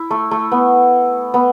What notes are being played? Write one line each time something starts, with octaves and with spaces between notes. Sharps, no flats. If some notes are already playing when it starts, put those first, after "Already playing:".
Already playing: E4
A3
A3
B3
B3